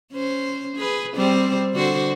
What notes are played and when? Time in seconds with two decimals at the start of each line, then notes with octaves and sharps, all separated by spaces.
0.12 C#4 C5
0.77 G#4 B4
1.16 G3 C4 C5
1.74 D3 F#4 C5